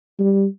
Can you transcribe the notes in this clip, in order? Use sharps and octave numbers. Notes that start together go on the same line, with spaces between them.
G3